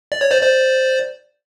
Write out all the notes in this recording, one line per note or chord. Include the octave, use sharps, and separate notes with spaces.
D5
C#5
C5 D5
C5 D5